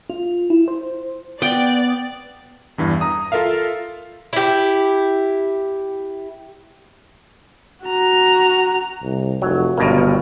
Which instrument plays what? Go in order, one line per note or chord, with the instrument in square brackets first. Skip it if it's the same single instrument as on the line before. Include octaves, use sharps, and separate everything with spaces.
[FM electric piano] F4
E4
C5
[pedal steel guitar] B3 [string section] D5 [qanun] G5
[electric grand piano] E2 G2 E3
A#5 D#6
F4 A4 A#4 E5 F5
[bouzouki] E4 G4
[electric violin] F#4 A#5
[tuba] C2
[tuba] F1 [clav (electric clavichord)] F#3
[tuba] G1 [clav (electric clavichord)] C#2 B2 A#3